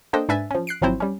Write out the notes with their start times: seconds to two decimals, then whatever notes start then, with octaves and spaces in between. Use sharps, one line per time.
0.13 A#3 D4 A4 C5 D#5 G5
0.29 G#2 D4 B4 E5 G#5 A6
0.51 F3 C#4
0.67 F#6 C7 D7
0.82 G#1 F3 F#3 C4 E4 C5
1.00 G3 C#4